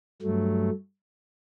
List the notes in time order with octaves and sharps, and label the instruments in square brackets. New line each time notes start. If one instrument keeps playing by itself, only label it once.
[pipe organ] G2 F#3 A3